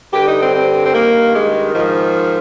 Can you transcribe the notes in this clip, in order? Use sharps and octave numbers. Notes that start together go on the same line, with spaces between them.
G2 D3 G4
D#4
C4
C4
C4
G2 D#3 A#3
G#3
G#2 D#3 F3